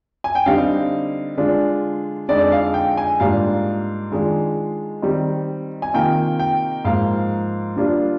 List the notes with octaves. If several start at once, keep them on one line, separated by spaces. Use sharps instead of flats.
G#5
G5
D3 G3 C4 D#4 F5
D3 G#3 D4 F4
F2 D3 G#3 D#4 D5
F5
G5
G#5
G#2 G3 A#3 D4 F4 F5
D#3 G#3 D4 F4
D#3 G3 C4
G#5
C3 D#3 A#3 F4 G5
G5
G#2 F3 A#3 F5
D3 G3 A#3 D4 F4